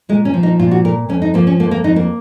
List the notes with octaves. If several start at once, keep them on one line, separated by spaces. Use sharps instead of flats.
A#2 G#3
C#4
F3
D#4
A#2 F4
F#4
A#2 A#4
F2 C#4
D#4
F3 A#3
C#4
F2 A#3
A#3
F2 D#4
A#3